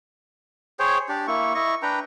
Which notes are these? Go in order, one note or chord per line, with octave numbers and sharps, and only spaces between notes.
G#4 C5 C#5 G5
D4 G4 D5
A#3 E4 C#6
E4 D#5 C#6
D4 B4 G5 A#5